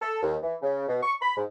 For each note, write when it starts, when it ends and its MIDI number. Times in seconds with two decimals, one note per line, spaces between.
0.01 0.18 69
0.22 0.35 39
0.42 0.55 52
0.62 0.85 49
0.88 1.02 47
1.02 1.14 85
1.21 1.36 83
1.36 1.44 44